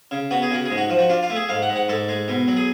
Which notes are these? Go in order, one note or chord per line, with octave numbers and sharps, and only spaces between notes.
C#3
B3 F#4
G#4
C#3 F#4
G#2 G#4
F#4
F3
F#4
D4 F4
F4
A3
G#4
G#2 F5
F#5
G#2
F#5
G#2 A4
G#3
B2
F#3
G#4